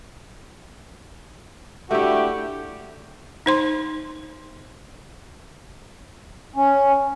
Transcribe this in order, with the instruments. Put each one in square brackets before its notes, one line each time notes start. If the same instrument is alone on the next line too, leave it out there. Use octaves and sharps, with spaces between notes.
[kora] A3 E4 [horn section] D4 F#4 G4
[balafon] D#4 C5 C6
[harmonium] C#4